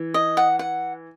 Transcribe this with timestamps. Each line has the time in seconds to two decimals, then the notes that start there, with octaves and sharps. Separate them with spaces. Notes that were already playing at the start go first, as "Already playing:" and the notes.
Already playing: E3
0.14 D#5
0.37 F#5
0.59 F#5